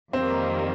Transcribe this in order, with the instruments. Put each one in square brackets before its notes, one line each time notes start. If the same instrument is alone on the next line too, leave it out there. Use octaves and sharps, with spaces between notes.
[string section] F2 D#3 G3 A#3 [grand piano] C4